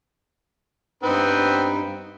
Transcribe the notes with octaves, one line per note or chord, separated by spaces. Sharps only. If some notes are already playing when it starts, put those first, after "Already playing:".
G2 B3 C4 D#4 B4